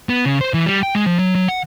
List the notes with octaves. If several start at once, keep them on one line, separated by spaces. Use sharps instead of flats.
B3
C#3
C5
E3
G3
G5
G#3
F3
F#3
F#3
F#5